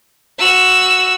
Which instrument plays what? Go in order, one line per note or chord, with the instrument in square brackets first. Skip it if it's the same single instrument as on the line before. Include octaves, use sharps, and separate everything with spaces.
[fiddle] F#4 E6